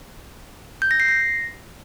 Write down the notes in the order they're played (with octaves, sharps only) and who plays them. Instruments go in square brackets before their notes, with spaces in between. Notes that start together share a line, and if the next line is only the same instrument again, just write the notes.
[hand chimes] G6
A#6
C7
A#6